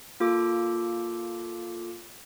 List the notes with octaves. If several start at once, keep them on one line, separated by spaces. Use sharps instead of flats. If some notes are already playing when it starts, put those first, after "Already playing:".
A#3 F4 A4 D6